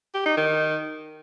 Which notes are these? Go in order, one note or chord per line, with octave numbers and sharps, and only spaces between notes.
G4
D#4
D#3